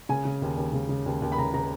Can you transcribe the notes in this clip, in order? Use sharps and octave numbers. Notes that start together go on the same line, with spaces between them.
C#3 G#5
C#3
D#2
D#2
C#3
C#3
D#2
D#2
B5
C#3 A#5
C#3 A#5